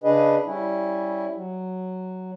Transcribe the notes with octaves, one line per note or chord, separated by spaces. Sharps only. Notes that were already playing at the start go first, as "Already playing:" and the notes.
C#3 D4 G#4 B4 D#5
G3 C#4 E4
F#3